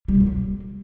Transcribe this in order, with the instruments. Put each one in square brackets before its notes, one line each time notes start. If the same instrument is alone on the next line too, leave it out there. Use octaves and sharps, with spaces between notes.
[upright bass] G3
B2
F#3
A#3